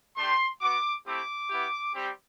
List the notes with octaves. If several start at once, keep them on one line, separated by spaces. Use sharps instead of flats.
A3 D4 G4 C6
B3 F#4 D6
A3 C4 E4 G4 D6
B3 E4 G4
G3 C4 G4